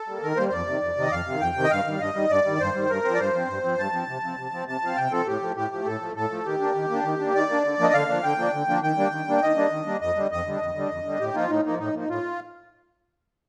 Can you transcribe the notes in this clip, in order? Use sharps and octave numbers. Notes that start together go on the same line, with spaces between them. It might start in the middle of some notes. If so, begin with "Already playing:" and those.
Already playing: A4
G3 A#3
D#3 A#4
G3 A#3 C5
C5
F2 D5
C3 D#3
F2
C3 D#3 D#5
F2 F5
C3 D#3
F2 G5
C3 D#3
D#5
G2 F5
D#3 G3
G2 D#5
D#3 G3
G2 D5
D#3 G3
G2 C5
D#3 G3
G2 A#4
F3 C4
D5
G2 C5
F3 C4
G2
F3 C4
G2 A5
F3 C4
C3
F3 C4
C3
F3 C4
C3 A5
F3 C4 F5
C3 G5
F3 C4 A4
A2 G4
F3 A3
A2 G4
F3 A3
A2 A4
F3 A3
A2 A4
F3 A3
D#3 G4
A#3 D4
D#3
A#3 D4
D#3
A#3 D4
D#3 D5
A#3 D4
D3
F3 A#3 D4 D#5
D3 F5
F3 A#3 D4
D3 G5
F3 A#3 D4
D3
F3 A#3 D4
D#3 G5
G3 A#3 D4
D#3
G3 A#3 D4
D#3 D#5
G3 A#3 D4
D#3
G3 A#3 D4
F2 D#5
D3 G3 D4
F2 D#5
D3 G3 D4
F2
D3 G3 D4
F2
D3 G3 D4
A2 G4
F3 A#3 D#4 F4
A2 D#4
F3 A#3 D#4
A2 D#4
F3 A#3 D#4
A2 F4